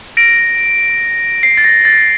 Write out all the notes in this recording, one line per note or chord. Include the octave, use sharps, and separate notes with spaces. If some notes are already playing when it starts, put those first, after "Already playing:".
A#6 D7
C7
A6
A#6
A6